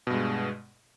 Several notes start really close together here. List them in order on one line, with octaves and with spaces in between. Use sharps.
B2 G2 G#3